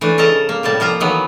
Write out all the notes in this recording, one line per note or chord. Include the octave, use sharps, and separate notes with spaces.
E3 A3 D4
C#3 A4 A#4 D#5 A5 A#5
A#3
A2 C3 G3 A5
F3 A#3 F4 A#5
D#3 E3 F#3 B3